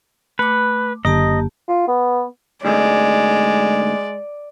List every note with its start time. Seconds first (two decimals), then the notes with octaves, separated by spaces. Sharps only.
0.39 A3 B4 D6
1.05 F#1 D3 A#3 G4 D#5 A5
1.68 F4
1.88 B3
2.65 D2 G#2 G#3 D5